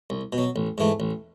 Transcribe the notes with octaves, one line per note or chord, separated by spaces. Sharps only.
C2
B2
F#3
A1
G#2 E3 A3
A1